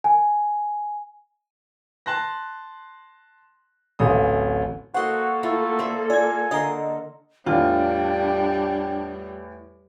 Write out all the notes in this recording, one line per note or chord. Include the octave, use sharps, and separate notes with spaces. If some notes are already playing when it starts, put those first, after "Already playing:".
G#5
A5 C6 F#6 A#6
D1 A1 A3 F5 D#6
A#3 F#4 A4 C5 D#5 F#5 C6
A3 E4 F4
C5 D5 E5
F4 D5 G#5 G#6
D3 A#4 D#5 A#5 C6
E2 A2 G3 D4 F4 G5